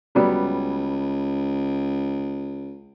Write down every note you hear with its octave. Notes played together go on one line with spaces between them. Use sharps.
C#2 F#3 G3 B3